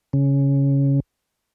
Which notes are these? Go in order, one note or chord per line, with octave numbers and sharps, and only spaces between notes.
C#3